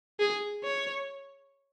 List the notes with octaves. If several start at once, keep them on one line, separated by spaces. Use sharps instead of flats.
G#4
C#5